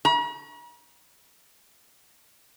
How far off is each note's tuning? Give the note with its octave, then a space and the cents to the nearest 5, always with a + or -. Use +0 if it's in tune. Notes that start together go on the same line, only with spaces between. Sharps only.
A#5 +45